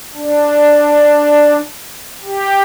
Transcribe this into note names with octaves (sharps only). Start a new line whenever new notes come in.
D4
G4